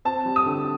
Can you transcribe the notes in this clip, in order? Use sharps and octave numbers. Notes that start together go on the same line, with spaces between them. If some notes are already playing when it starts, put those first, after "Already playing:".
C4 A5
G3
D#6
D3